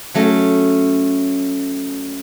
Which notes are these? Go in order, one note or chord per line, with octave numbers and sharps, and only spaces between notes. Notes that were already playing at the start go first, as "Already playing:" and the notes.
F#3 A3 C#4